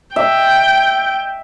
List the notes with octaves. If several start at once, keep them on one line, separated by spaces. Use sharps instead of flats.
E5 G5